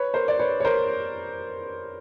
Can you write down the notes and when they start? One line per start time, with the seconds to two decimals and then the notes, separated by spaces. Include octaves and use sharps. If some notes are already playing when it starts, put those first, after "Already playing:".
Already playing: B4 C#5
0.14 A#4 C5
0.28 D5
0.39 B4 C#5
0.60 C#5
0.65 A#4 C5